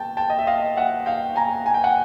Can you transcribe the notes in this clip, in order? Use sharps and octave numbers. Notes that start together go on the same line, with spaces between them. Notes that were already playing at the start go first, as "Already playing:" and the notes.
Already playing: G5 A5
G5 A5
D#5
E5
D#5 F5
E5 F#5
F5 G5
G#5 A#5
G#5
G5
F#5 G#5